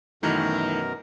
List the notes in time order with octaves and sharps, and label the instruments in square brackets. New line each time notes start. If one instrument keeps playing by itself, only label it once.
[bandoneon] F#2 B2 A#4 [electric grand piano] D#3 E3 A3